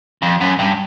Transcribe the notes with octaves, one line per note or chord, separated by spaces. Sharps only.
F2
F#2
G2